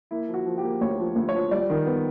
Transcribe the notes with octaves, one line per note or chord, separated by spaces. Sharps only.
A#3 E4
F3
F#4
F3
G4
A#3
D2 C#5
F3
D2
C#5
F3
G3 D5
D#3
B3